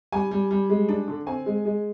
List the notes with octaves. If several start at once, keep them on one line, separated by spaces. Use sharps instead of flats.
G3 G#5
G3
G3
G#3
D4
D3
C4 G#5
G#3
G#3